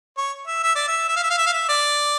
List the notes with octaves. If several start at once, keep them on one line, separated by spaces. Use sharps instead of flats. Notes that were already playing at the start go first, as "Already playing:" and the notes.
C#5
E5
E5
D5
E5
E5
F5
E5
F5
E5
F5
E5
D5